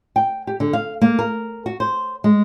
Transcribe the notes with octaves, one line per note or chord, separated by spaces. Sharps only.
G5
G4
D3
F5
A#3
A#4
F#4
C5
G#3